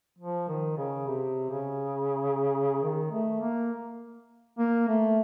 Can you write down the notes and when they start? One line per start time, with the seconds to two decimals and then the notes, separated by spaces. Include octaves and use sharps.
0.18 F3
0.48 D#3
0.78 C#3
1.07 C3
1.50 C#3
2.83 D#3
3.11 A3
3.41 A#3
4.58 A#3
4.88 A3